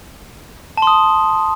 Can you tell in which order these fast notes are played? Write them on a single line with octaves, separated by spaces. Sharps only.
A5 C6 D#6